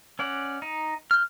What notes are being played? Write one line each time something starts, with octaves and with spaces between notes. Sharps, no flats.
C#4 D5 F#5
D#4
F6 G6